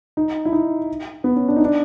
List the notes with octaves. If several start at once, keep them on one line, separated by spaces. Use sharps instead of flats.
D#4
E4
D#4
B3
C#4
D4
D#4
D4